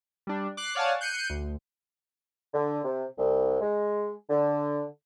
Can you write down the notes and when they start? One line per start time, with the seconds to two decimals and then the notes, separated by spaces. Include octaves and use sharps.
0.27 G3 D4
0.57 D6 F#6 C7
0.75 C#5 D5 F5 F#5 G#5 A5
1.01 F#6 G6 C7 C#7 D#7
1.30 D2
2.53 D3
2.84 C3
3.18 C2
3.61 G#3
4.30 D3